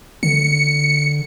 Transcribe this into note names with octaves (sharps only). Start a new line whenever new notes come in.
D3 C#7